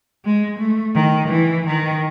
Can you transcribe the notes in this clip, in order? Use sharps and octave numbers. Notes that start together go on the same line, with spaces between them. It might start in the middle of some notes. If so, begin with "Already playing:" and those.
G#3
A3
D#3
E3
D#3